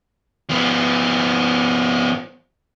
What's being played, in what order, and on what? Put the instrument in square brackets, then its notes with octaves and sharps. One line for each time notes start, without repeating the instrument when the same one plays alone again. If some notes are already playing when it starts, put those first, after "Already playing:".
[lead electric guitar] F3 B3